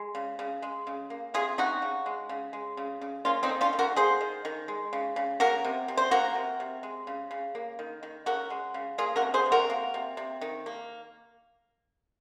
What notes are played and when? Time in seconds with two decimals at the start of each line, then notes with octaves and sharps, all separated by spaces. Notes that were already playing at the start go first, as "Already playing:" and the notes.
Already playing: G#3
0.15 C#3
0.39 C#3
0.62 G#3
0.87 C#3
1.10 A#3
1.34 C3 F4 G#4
1.58 C3 D#4 F#4
1.82 C#3
2.06 G#3
2.29 C#3
2.53 G#3
2.77 C#3
3.01 C#3
3.25 A#3 C#4 F4
3.43 C4 D#4
3.49 D#3
3.61 C#4 F4
3.73 D#3
3.79 F#4 A#4
3.96 A#3 G#4 C5
4.21 D#3
4.45 D#3
4.68 G#3
4.93 C#3
5.16 C#3
5.40 A#3 F#4 A#4
5.65 C3
5.88 C3
5.97 C5
6.11 A#3 F#4 A#4
6.35 C3
6.60 C3
6.83 G#3
7.07 C#3
7.31 C#3
7.55 A#3
7.79 D#3
8.03 D#3
8.26 C#3 F#4 A#4
8.50 G#3
8.74 C#3
8.98 A#3 F4 G#4
9.16 F#4 A#4
9.22 C3
9.34 G#4 C5
9.46 C3
9.52 F#4 A#4
9.70 A#3
9.94 C3
10.17 C3
10.41 D#3
10.66 A#3